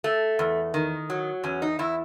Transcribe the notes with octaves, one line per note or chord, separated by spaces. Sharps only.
A3
E2
D#3
F#3
E2 C#4
D#4
E2 E4